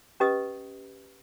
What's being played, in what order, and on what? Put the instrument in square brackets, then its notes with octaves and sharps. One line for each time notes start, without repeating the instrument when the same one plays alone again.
[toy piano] C#4 G4 B4 D#5 D#6